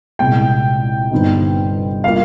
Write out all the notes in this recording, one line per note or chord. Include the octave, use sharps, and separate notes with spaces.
C2 A#2 G#3 G5
G1 G2 G3 C4 D#4
G3 A#3 F4 F5